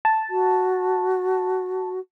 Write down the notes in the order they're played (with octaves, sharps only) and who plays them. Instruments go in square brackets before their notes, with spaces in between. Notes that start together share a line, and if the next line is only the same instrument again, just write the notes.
[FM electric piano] A5
[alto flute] F#4